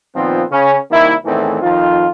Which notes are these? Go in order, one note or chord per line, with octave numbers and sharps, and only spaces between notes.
A#2 D#3 F3 B3 C4 F4
C#3 C#4
C2 D#3 A#3 E4
E2 A2 D#3 E3 A3 C4
F2 D#3 F3 F4